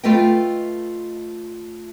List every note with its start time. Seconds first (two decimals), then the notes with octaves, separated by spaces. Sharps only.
0.04 A3 F4 A4 B4 D#5 G5